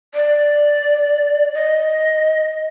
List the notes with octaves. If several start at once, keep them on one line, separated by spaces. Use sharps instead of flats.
D5
D#5